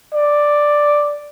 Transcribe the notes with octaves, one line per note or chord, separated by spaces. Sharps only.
D5